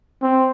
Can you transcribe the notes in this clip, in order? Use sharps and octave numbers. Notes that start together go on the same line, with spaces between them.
C4